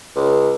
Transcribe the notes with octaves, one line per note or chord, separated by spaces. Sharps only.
C#2